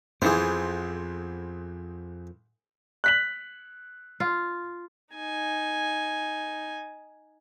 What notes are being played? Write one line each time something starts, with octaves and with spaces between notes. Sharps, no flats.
B1 F2 E3 G#4 C5
F#6 B6 F#7
F4
D#4 G#5